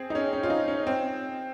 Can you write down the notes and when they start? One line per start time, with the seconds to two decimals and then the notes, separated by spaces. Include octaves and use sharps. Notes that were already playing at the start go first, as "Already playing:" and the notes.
Already playing: C4 G#4
0.10 D#4
0.15 C#4
0.33 C#4
0.43 F4
0.50 D#4
0.68 C#4
0.87 C4